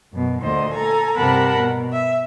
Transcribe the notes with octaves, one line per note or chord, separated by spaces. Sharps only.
F#2 B2
D2 A#2 D3 C5 D#5
A4 G#5 A#5
G2 C3 A#4 F#5 A5 B5
B2
E5